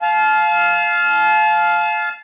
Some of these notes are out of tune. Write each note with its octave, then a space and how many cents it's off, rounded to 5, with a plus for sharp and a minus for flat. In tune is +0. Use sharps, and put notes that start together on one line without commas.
F5 +0 A5 -35